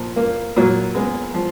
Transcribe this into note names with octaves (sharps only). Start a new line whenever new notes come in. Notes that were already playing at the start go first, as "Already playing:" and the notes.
Already playing: A#2 F3
A#3
A#2 F#3
G#3 B3
F3